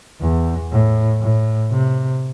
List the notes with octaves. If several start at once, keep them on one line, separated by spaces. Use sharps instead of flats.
E2
A2
A2
C3